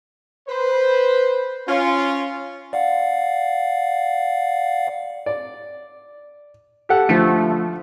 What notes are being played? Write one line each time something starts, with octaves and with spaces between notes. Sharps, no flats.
B4 C5
C#4 F4
D5 F5 F#5
D5
G4 A4 F#5
D3 F3 A3